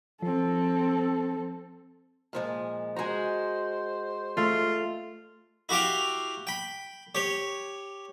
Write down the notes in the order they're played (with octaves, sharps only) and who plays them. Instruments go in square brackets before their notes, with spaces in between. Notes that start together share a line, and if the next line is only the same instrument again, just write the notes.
[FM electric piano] F3 [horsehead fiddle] C4 A4
[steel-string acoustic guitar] A#2 F3 G#3
[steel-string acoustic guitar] G#3 F#4 [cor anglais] C5 [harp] G#5 A#5
[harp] A3 [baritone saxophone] F4
[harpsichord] E4 F#4 G4 F5 G5
G5 B5
G4 C#5